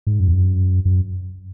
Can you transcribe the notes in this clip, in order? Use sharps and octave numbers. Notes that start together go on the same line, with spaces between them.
G#2
F#2
E2
F#2
F#2